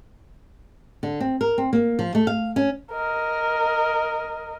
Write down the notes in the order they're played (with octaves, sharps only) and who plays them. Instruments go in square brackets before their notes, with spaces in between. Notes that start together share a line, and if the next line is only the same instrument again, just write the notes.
[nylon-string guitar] D3
C4
A#4
C4
A#3
F3
A3
F5
C#4
[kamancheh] A#4 D#5